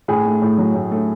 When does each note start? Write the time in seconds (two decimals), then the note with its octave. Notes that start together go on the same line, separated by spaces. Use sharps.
0.08 A2 G#4
0.26 A3
0.42 A2
0.58 F#3
0.75 A2
0.91 A3